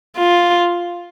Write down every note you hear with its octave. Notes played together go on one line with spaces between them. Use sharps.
F4